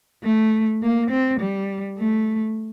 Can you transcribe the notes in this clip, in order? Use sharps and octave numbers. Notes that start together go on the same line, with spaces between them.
A3
A#3
C4
G3
A3